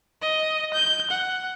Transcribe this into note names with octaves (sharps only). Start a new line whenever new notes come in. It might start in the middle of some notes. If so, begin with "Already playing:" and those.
D#5
G6
F#5